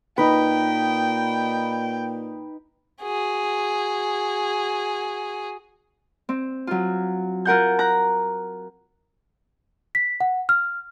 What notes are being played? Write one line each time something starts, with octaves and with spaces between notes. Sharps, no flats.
A#2 D#4 B4 G5
F#4 G#4
C4
F#3 F4
F4 A#4 F#5 G6
A#5 F#6
B6
F#5
F6